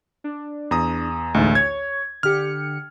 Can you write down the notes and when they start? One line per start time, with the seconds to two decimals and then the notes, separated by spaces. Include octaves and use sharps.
0.24 D4
0.71 E2 A#5 D#6
1.34 A1 D2 G#3 D#4
1.55 C#5 G#6
2.23 D3 G4 F6 C#7